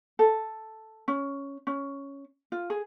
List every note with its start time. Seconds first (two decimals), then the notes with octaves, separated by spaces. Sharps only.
0.19 A4
1.08 C#4
1.67 C#4
2.52 F4
2.70 G#4